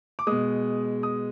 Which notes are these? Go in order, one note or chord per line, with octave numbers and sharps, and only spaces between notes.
D6
B2 G#3 D#6
D#6